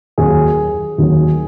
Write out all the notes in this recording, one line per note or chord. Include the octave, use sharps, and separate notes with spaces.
D#2 D#3 F#3 G#4
D#2 D#3 F#3